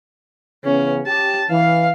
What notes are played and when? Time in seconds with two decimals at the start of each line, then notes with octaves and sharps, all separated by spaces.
0.64 C#3 E3 B3 C#4
1.07 G4 A5
1.51 E3 F5